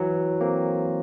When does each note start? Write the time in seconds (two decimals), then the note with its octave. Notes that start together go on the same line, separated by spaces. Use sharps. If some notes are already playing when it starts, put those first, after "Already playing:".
Already playing: E3 F#3
0.41 A#3 C4